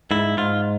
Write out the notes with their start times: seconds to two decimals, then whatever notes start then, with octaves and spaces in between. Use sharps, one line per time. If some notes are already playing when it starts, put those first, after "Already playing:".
0.11 G#2 E4
0.37 G#2 F4